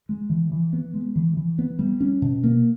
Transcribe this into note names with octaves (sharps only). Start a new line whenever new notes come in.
G#3
E3
E3
B3
G#3
E3
E3
B3
G3
C#4
B2
A#3